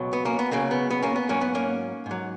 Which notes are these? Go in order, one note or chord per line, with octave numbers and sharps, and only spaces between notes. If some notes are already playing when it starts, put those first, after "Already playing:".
Already playing: C#2 B2 F#3
B3
A#3 C#4
B3
C#2 C#3 F#3 A#3
B3
B3
A#3 C#4
B3
G#2 F#3 A#3 C#4
B3
A#3 C#4
G#2 F#3